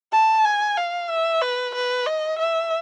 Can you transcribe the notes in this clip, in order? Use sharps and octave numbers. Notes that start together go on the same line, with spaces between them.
A5
G#5
F5
E5
B4
B4
D#5
E5